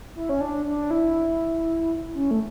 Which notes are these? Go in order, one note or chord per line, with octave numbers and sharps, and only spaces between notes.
E4
C#4
D4
D4
E4
C#4
A3